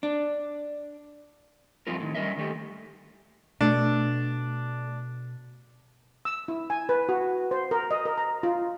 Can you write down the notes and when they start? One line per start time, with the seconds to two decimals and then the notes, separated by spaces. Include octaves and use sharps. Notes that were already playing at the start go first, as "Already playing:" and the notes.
0.03 D4
1.87 G2 F3 A3 C4 F4 A#4
2.00 A2 D#3
2.15 G3 C#4 D#4 A#4 D#5 E5
2.37 D#3 A3 G4
3.61 B2 A3 D4
6.25 E6
6.48 E4
6.70 G#5
6.89 B4
7.09 F#4
7.51 C5
7.71 A#4
7.91 D#5
8.05 A#4
8.18 A#5
8.43 F4